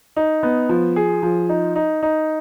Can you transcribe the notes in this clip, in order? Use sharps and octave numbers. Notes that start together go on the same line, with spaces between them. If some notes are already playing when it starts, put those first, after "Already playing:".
D#4
B3
F3
G#4
F3
D#4
D#4
D#4